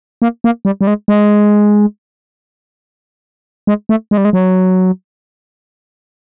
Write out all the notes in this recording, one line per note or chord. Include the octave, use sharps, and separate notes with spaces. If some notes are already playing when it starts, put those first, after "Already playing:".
A#3
A#3
G3
G3
G#3
G#3
G#3
A3
G#3
G3
G#3
F#3